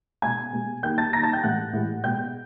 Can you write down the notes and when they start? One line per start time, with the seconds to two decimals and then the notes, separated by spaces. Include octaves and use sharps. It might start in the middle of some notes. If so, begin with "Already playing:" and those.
0.22 B2 G#3 G#5 G#6
0.53 B2 G#3
0.83 D#3 G3 A#3 G5 G6
0.98 A5 A6
1.13 D#3 G3 A#3 A#5 A#6
1.23 A5 A6
1.33 G5 G6
1.43 A2 E3 G#3 F#5 F#6
1.73 A2 E3 G#3
2.04 B2 G#3 G5 G6